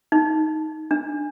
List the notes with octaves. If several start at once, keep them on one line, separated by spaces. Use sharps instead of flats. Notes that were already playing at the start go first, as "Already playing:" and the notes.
D#4
D4